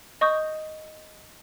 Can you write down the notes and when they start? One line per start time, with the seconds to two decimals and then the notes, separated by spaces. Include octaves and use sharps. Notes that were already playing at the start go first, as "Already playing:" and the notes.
0.21 D#5 C#6 D#6 G6